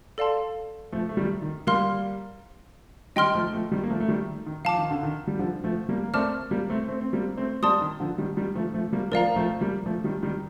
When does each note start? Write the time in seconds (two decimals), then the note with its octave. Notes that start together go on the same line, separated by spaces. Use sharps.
0.18 A4 D5 F5 A5 C6
0.92 F3 A3
1.09 A3
1.17 D#3 G3
1.42 D#3
1.67 G3 A#3 A#4 F5 C6 F6
3.16 D#3 G3 D#5 G5 C6 F6
3.35 F3 A3
3.53 F3 A3
3.72 D#3 G3
3.83 A#3
3.90 F3 A3
4.00 A3
4.08 D#3 G3
4.46 D#3
4.65 F3 F5 A5 D6
4.78 D#3
4.91 D3
5.03 D#3
5.27 G3
5.39 D3 F3
5.64 F3 A3
5.89 G3 A#3
6.04 A#3
6.14 A3 C4 A#4 D5 A5 D6 F6
6.51 G3 A#3
6.69 A3 C4
6.88 A3 C4
7.01 C4
7.13 G3 A#3
7.37 A3 C4
7.62 G3 A#3 D5 A5 C6 D#6
7.81 D#3
8.00 D3 F3
8.18 D#3 G3
8.37 D#3 G3
8.55 F3 A3
8.74 F3 A3
8.93 G3 A#3
9.11 F3 A3 A#4 D5 F5 A#5
9.36 F3 A3
9.61 G3 A#3
9.86 F3 A3
10.04 D#3 G3
10.23 D#3 G3